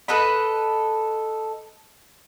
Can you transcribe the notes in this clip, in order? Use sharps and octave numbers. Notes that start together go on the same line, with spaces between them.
A4 B4 D#5 B5